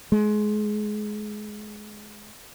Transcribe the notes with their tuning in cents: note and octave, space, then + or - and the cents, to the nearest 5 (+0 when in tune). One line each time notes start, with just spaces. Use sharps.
G#3 +25